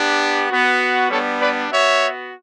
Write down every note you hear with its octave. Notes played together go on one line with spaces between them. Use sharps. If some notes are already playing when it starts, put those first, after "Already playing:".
Already playing: B3 D4 G4
B3 F#4
G3 B3 D4 A4 C#5
B4 D5
B3 F#4 C#5 E5